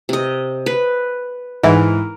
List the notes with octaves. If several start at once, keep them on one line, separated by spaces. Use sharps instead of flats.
C3 D#5
B4
G#2 E3 A#4